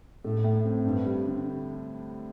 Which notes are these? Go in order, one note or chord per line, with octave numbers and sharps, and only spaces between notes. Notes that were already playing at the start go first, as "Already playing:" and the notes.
A2 A3
A2
C4
G2 D4
G3
D3